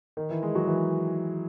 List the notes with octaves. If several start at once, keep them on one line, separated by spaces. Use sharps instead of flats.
D#3 D#4
E3 E4
G#3 G#4
F#3 F#4
E3 E4